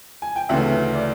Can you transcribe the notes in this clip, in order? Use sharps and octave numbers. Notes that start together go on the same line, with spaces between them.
G#5
G5
D2 C#3 E3 A3 E5 F#5
D5